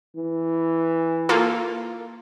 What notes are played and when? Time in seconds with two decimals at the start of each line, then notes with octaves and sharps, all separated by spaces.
0.16 E3
1.29 A#3 F4 A4